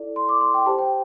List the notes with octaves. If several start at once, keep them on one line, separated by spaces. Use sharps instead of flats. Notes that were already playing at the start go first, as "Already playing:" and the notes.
Already playing: E4 A4 D5
C6
D6
C6
G5
G4 C5 A5
G5